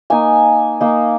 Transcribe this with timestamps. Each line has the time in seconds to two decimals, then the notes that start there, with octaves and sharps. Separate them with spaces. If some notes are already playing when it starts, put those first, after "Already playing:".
0.10 A#3 D#4 G#5
0.81 A#3 D#4